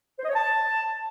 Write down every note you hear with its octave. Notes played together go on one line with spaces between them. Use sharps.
C5
D#5
C#5
A5